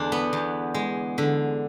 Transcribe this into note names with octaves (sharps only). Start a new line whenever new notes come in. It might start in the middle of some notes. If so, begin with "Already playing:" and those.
Already playing: E2 D3 G#3 D4
B3
E2
G#3
D3